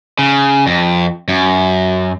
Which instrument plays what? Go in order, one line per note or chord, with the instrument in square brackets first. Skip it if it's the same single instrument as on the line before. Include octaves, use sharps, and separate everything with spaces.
[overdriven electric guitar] C#3
F2
F#2